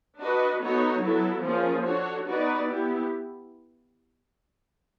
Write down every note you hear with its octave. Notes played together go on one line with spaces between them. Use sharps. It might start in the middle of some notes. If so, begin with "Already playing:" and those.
D4 F#4 B4 D#5
B3 D#4 F#4 A4 C#5
F#3 B3 E4 A4
F3 A#3 C#4 F4 G#4
D4 F#4 A4 C#5
B3 D#4 F#4 B4 D5
B3 E4 G4